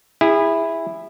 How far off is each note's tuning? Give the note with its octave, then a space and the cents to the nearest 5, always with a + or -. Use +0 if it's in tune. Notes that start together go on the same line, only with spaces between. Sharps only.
E4 +0 G#4 -30